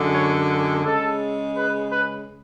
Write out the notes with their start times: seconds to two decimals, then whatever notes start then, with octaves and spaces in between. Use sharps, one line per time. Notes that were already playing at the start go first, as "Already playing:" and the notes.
Already playing: F#2 D3 G#3
0.13 C#5
0.85 C#3 G#3 A4
1.56 B4
1.92 B4